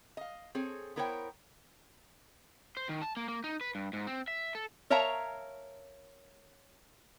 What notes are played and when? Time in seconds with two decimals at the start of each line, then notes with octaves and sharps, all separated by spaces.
0.17 D#5 F5
0.55 C4 G#4 A4 C#5
0.96 B3 E4 A#4 C5 C#5 G5
2.77 C5
2.89 D#3
3.02 A5
3.17 A#3
3.28 A#3
3.44 D#4
3.61 B4
3.75 G2
3.93 G#2
4.07 C4
4.28 E5
4.55 A4
4.90 A#4 C#5 E5 F5 A5 A#5